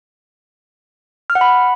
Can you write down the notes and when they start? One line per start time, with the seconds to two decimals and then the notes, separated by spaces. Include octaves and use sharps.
1.30 F6
1.35 F#5
1.41 B5